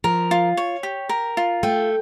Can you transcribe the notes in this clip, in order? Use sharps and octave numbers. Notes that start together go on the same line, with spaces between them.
F3 A#4
F4
C#5
G4
A#4
F4
A3 G5